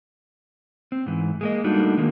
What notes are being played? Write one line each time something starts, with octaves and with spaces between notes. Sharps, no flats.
C4
G#2 E3
G#3 A#3 D#5
G3 A3 A#3 D4 D#4 F#4
D3 D#3 G#3 A#3